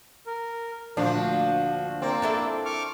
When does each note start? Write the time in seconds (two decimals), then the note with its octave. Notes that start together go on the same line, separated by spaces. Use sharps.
0.27 A#4
0.97 D2 A#2 F3 D4 F#4
2.02 A#3 C4 D5
2.22 D4 E4 A4
2.65 C#6 D6 F6